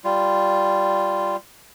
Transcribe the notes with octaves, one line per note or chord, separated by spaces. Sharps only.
G3 F4